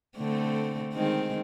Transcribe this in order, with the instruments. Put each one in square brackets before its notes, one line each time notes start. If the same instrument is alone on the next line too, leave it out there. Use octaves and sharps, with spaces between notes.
[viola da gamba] D3 A3 C4
D#3 G#3 C4